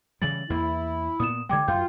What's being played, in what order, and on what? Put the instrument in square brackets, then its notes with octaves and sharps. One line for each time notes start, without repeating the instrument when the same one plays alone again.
[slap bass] C#3 E3 G3 [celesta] A6 F#7
[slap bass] E2 A#3 [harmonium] E4
[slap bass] A#2 B3 [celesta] D#6 E7
[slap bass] D3 G3 G#3 [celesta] G5 D6 G#6
[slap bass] F#2 [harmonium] F4 [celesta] G5 G6